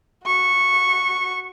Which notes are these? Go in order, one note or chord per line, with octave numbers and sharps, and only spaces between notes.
F#4 C#6